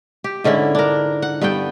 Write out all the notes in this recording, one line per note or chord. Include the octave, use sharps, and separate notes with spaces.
G4
G#2 D3 C#4 E4
D4 A#4
F#5
G2 B3 A4 G5